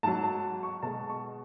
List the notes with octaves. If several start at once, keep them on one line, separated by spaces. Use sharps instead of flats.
G#2 F#3 A5
A5
C#6
B2 G#3 A5
C#6